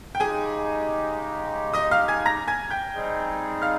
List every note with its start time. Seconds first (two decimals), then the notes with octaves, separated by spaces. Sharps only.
0.15 G5
0.20 C#3 G#3 D#4 G4 G#4 G#5
1.74 D#5 D#6
1.91 F5 F6
2.08 G#5 G#6
2.26 A#5 A#6
2.48 G#5 G#6
2.70 G5 G6
2.94 G3 C4 D#4 G#4
3.62 F5 F6